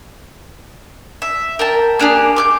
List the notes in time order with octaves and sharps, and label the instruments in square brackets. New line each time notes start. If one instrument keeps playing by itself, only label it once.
[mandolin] E5
A#4 G5 A5
A#3 D4 G4 G#4
D6 F6 G6